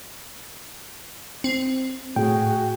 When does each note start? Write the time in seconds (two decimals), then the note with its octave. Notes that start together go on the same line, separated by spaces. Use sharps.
1.44 C4
2.16 A2 F#4 G#4 G5